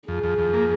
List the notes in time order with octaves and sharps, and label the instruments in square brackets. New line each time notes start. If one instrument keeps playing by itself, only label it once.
[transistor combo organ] F2 [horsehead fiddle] G#4
[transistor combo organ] F2
F2
A#3